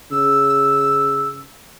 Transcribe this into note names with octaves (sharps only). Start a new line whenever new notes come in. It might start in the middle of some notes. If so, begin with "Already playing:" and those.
C#3 E6